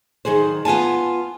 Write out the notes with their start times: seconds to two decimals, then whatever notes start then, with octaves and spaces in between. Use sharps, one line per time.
0.25 D#3 F#3 G#4 C5
0.65 B3 F4 G#5 A5